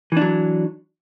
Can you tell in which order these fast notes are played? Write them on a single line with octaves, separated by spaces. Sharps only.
E3 D4 F#3